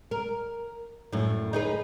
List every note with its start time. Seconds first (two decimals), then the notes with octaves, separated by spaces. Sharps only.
0.11 A#4
1.13 F#2 A2
1.53 D#4 G#4 B4